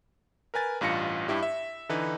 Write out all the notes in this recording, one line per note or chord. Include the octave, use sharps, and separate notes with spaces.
A#4 B4 G#5 A6
A1 G2 F4 A#6 C#7
G2 E4 G4
E5
D3 E3 D#4 B4